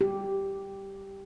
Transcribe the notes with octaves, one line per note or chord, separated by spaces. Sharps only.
G4